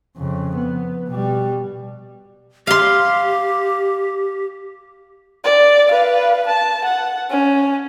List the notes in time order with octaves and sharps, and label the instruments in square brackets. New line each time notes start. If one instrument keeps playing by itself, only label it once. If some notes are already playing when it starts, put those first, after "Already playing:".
[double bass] F2 C#3
B3
B2 G3
[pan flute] G4 [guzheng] F5 C6
[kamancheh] D5
B4 F5
A5
F#5
C#4